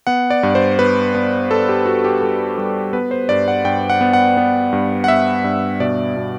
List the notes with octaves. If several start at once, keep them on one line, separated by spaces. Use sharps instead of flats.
B3 F#5
D5
G2
C5
B3 B4
B3
B3 A4
G4
B3 F#4
G4
G3 A4
G3
B3 B4
C5
G2 D5
F#5
G2 G5
F#5
B3
F#5
B3
G2
F#5
B3 E5
G2
B2 D5
B2